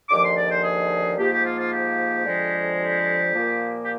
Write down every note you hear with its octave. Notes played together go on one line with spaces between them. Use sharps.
D#2 D3 F3 G#3 D6
C6
D5
C5
G#4
G#2 F3 A#3 G4
G4
F4
F4
G4
F2 D3 F3 G#3
G4
A#2 F3 A#3
G4